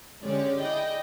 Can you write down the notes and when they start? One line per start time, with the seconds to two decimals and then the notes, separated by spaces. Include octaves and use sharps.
0.22 D3 G#3 C#4 G4 C#5 D5
0.61 E4 G#4 D5 D#5 G5